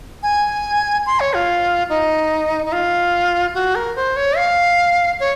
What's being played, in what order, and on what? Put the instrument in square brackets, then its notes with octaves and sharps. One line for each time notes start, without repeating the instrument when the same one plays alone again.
[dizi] G#5
C6
C#5
F4
D#4
D#4
F4
F#4
A#4
C5
C#5
F5
C#5